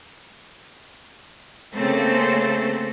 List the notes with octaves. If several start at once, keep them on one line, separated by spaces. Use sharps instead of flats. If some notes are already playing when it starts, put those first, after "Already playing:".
C#3 A3 A#3 C4 A4 C5